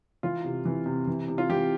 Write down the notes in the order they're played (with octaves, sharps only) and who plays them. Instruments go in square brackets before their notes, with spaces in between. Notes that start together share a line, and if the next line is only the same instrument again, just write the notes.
[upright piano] E3 F4
C3
E3
C3
E3
C3
F4
E3 G4